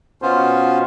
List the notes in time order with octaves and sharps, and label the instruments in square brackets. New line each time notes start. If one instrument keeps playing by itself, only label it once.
[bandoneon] B2 B3 C#4 F4 C5